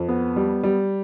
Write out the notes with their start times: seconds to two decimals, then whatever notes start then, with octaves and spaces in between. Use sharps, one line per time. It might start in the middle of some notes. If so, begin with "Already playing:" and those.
Already playing: F2
0.08 B3
0.36 G3
0.63 G3